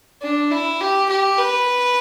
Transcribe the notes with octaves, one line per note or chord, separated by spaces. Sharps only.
D4
E4
G4
G4
B4